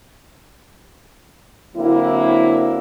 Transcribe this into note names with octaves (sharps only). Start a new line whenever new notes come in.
D3 F#3 A#3 C4 E4